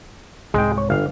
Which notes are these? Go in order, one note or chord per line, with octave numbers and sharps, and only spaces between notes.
C2 G#2 G#3 G5
C#5
G1 F5